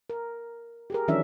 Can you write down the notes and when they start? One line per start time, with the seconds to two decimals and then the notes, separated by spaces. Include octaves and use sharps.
0.10 A#4
0.90 G4 G#4 A#4
1.08 D#3 E3 F#3 C#4 D4 E5